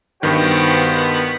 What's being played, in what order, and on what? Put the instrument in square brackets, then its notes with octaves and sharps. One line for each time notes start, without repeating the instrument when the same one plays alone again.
[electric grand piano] G2 D#3 [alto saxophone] B3 [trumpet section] F#4 C5 G5